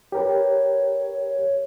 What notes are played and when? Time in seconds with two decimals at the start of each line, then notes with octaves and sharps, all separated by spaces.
0.12 G4 A#4 B4 C#5